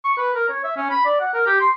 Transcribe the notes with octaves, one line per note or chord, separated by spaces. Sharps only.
C#6
B4
A#4
C#5
E5
C#4
B5
D5
F#5
A#4
G4
C6